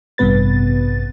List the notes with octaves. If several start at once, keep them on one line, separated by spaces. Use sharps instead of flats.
A1 G2 C3 B3 B4 A6